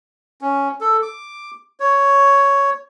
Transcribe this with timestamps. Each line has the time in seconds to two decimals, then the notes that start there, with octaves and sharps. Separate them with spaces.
0.41 C#4
0.81 A4
1.02 D6
1.80 C#5